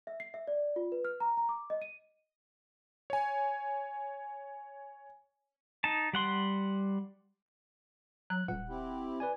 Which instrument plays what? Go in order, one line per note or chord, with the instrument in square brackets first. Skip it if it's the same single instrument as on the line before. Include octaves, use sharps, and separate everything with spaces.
[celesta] E5
C7
E5
D5
F4
B4
F6
A#5
A#5
D6
D#5
D#7
[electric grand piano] C#5 G#5
[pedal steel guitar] D#4 A5
G3 F#5 C6
[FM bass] F#3 [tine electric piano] F#6
[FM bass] D#1 [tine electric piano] F#5
[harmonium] C4 E4 G4
[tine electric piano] B4 D5 G#5